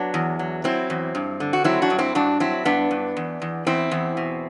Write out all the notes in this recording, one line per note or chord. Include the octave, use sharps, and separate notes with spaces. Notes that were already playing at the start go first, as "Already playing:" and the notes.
Already playing: F#3 B3 D4
E2
F#3
F#3 C4 E4
E2
G2
D3
F#4
F#3 C4 E4
D4 F#4
G2
C4 E4
G2 D4 F#4
F#3 C4 E4
G2 B3 D4
G2
E2
E2
E2 C4 E4
E2
B2